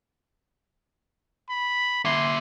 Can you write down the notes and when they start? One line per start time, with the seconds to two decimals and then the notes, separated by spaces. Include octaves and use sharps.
1.49 B5
2.05 A#3 E5 C6